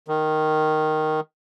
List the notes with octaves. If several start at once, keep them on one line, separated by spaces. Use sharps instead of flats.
D#3